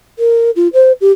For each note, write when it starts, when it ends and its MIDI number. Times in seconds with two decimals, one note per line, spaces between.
0.19 0.50 70
0.56 0.68 65
0.73 0.92 72
1.01 1.12 67